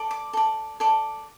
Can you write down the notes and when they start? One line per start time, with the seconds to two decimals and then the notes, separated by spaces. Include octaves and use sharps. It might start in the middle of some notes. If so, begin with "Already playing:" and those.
Already playing: A4 D5
0.11 D6
0.33 A4 D5
0.80 A4 D5